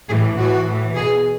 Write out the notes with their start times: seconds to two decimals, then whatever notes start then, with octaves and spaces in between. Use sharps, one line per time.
0.09 A2 E3 G#4
0.37 A2 E3 F#4
0.66 A2 E3
0.94 B2 G#4